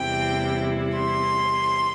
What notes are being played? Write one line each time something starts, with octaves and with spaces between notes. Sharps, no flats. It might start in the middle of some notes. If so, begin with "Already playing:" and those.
Already playing: E2 C3 G3 C4 E4 G5
C6